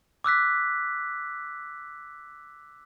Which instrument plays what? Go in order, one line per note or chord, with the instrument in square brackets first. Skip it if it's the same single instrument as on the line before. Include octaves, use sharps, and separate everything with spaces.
[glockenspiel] D6 E6 F#6 B6